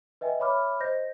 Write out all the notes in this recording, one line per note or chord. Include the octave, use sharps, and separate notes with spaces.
B4 D#5 E5 G5 G#5
C#5 E5 B5 D6 F6
C5 D#5 G6 A#6